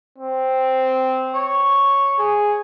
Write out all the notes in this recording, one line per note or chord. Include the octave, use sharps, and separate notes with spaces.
C4
C#5
G#4